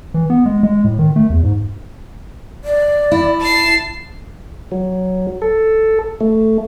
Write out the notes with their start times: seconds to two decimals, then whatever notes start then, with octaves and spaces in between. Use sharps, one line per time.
0.14 E3
0.30 B3
0.46 G#3
0.63 G#3
0.85 A2
0.99 D#3
1.16 A3
1.30 E2
1.43 G#2
2.64 D5
3.12 E4
3.40 A5 C7
4.72 F#3
5.42 A4
6.21 A3